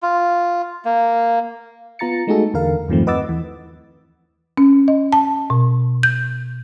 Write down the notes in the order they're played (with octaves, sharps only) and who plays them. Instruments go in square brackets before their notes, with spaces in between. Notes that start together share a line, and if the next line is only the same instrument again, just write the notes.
[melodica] F4
A#3
[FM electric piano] B3 F4 A#5 A6 C#7
G#3 A3 D#4 F#4 G#4 A4
E2 D3 A#4 F5
E2 G2 D#3 F3 A3 C4
B4 D#5 F#5 D6 E6 A6
D#2 E3
[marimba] C#4
D#5
A5
B2
G6